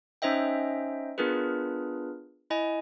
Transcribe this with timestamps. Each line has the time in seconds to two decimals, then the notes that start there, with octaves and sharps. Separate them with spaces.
0.22 C#4 D#4 C5 D#5 E5 G5
1.18 B3 D4 F4 G#4 A#4 B4
2.50 E4 D#5 G#5